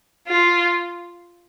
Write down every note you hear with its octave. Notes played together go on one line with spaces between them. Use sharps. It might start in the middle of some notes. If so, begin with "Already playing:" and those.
F4